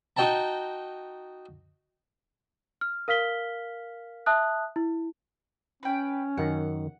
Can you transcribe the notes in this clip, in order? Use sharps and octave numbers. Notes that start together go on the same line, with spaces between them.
D#4 F#4 D#5 G5 A5 A#5
F6
A#4 F5 F6 B6 G7
E5 A5 D#6 F#6
E4
C#4 B4 G5
F#2 D#3 F#5